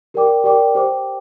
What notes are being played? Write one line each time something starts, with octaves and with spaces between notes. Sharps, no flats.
G4 A#4 D5 G5 D6
G4 A#4 D5 G5 D6
G4 C5 G5 D6